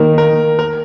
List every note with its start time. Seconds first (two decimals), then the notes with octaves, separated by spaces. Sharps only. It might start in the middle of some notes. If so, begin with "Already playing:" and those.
Already playing: D#3 A#3 A#4
0.18 A#4
0.59 A#4